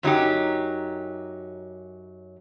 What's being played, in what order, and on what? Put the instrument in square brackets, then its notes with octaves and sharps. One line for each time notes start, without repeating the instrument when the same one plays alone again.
[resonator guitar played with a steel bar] F#2 F#3 D#4 G4